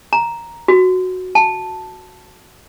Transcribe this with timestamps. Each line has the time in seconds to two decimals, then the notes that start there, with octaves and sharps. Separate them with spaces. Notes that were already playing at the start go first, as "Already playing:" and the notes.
0.13 A#5
0.68 F#4
1.35 A5